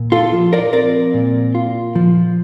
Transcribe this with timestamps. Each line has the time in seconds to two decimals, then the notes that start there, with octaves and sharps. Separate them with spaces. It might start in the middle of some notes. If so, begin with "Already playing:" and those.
Already playing: A#2
0.12 F4 A4
0.33 F3
0.53 A#4 D5
0.73 C4 A#4 D5
1.14 A#2
1.55 F4
1.95 F3